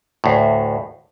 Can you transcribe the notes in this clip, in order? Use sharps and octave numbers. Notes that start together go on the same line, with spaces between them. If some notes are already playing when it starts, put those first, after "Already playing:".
D2 A2